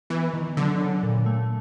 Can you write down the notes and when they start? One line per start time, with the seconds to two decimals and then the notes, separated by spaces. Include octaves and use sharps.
0.10 E3 B3
0.33 D#3
0.57 D3 F#3
0.80 C#3
1.03 A#2
1.26 A3